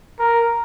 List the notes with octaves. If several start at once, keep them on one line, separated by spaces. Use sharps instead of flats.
A#4